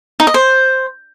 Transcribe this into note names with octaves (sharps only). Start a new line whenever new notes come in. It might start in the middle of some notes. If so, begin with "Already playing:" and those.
D#4
D#5
C5